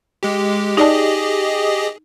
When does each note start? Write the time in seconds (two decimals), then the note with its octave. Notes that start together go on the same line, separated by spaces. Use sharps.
0.23 G#3 G4
0.77 D#4 G4 G#4 D5 D#5 A5